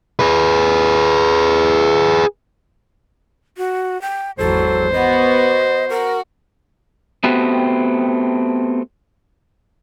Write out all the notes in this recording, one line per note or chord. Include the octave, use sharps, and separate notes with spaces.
G#4 B4
F#4
G5
G#1 E2 F#3 A4 C5
B3 F#4 D#5
F#4 A#4
A3 B3 C4 F#4 G4